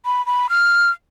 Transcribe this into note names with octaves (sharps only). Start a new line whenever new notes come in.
B5
B5
F6